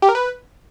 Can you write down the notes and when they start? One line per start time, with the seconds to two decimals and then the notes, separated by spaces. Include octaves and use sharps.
0.02 G4
0.09 A#4
0.15 B4